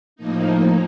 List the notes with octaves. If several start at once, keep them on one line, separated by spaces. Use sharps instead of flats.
A2 F3 A#3 D#4